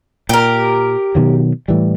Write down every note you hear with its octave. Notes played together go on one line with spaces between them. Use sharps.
A#2 G4 A#4
B2 D#3 F#3
A2 E3 G3